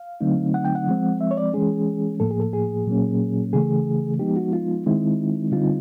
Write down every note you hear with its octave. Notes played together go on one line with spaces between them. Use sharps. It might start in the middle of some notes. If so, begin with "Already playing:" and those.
Already playing: F5
D3 F#3 A3 C4 D#4
F#5
G5
F#5
F3 G#3 C4
E5
C#5
D5
E3 G#3 C#4 G#4
A2 F3 A#3 A4
G#4
A4
G#4
A#2 F#3 A#3 C#4
C#3 E3 A3 G#4
F3 G#3 B3 D#4 G4
F#4
F4
D#3 G#3 C4 D#4 E4
D3 G3 C4 D#4 F4